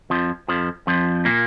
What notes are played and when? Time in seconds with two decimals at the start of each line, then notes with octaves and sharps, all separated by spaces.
0.10 F2 F3
0.48 F2 F3
0.87 F2 F3
1.25 A#2 A#3